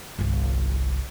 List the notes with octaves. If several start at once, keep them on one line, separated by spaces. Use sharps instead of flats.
G1 C2